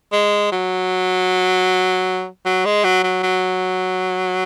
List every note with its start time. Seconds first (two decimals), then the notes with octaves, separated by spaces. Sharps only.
0.13 G#3
0.52 F#3
2.46 F#3
2.65 G#3
2.84 F#3
3.04 F#3
3.23 F#3